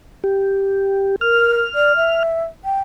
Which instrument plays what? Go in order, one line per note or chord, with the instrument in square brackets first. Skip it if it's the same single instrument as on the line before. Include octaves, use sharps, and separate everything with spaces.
[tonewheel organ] G4
[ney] A#4 [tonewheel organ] F6
[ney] D5
E5
G5